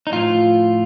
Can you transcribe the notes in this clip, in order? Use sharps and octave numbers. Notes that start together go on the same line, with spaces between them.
D#4
A2 F3 F4